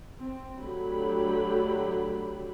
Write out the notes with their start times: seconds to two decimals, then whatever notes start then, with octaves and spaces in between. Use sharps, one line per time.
0.18 C4
0.59 D3 F#3 A3 G4 B5